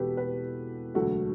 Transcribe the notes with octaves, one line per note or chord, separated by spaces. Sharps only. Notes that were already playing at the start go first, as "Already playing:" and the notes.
Already playing: E1 E2 B2 F#4 G4 A4 B4
G4 B4
E1 D2 D3 F#3 F#4 A4